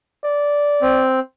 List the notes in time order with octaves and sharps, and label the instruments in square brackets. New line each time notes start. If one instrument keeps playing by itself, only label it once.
[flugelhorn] D5
[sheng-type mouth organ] C4